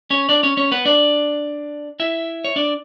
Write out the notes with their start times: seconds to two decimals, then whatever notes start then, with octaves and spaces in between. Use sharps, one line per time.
0.10 C#4 C#5
0.29 D4 D5
0.43 C#4 C#5
0.57 C#4 C#5
0.71 B3 B4
0.85 D4 D5
2.00 E4 E5
2.45 C#5
2.56 D4 D5